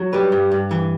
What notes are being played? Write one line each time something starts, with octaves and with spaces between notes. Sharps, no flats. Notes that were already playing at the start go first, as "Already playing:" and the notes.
Already playing: F#3
G3 G4 B4
G2
G2
E3